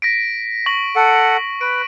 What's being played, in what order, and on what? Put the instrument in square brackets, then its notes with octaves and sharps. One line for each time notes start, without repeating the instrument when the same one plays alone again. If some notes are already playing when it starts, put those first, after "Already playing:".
[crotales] A#6 B6 D7
C#6 A#6 F#7
[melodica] A4 F#5
[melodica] B4 [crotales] D7